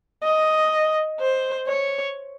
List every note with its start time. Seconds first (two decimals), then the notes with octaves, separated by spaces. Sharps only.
0.23 D#5
1.20 C5
1.68 C#5